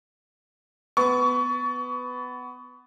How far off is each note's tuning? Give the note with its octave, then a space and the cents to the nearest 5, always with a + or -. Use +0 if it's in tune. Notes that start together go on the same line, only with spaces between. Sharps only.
B3 +15 C#6 +30